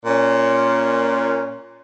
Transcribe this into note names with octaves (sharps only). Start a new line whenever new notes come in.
A#2 C#4